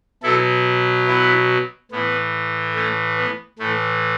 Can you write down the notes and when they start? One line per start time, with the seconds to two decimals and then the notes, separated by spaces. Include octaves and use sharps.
0.23 B2 F#3 E4 A4
1.07 B3 E4
1.91 A2 E3 B3
2.75 A3 C#4
3.17 B3
3.59 A2 E3 A3